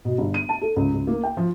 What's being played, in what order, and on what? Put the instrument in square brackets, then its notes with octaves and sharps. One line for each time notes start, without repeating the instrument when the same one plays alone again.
[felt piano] B2
G1
D#7
A5
A4
C#2
C#2
A#3
G5
F3